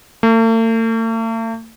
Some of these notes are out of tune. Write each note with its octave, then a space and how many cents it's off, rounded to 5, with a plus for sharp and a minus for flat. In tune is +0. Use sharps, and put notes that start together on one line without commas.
A3 +45